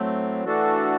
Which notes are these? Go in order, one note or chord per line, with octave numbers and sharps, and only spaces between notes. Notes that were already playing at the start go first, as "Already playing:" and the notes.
Already playing: A2 F#3 A3 C4
E3 A3 D4 F#4 A4